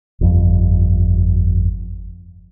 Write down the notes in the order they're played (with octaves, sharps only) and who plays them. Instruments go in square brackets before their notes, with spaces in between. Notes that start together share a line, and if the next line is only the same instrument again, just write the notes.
[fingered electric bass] G1 F2